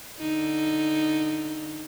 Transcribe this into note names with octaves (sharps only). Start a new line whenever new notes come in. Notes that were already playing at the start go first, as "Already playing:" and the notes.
D3 D#4